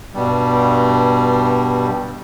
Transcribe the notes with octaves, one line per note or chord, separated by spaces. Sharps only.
G2 B2 G3